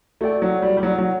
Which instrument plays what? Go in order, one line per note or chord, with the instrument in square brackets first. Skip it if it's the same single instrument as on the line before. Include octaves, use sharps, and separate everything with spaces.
[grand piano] A3 [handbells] F#4 A4 D5 G5
[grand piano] F#3
G3
G3
F#3
F#3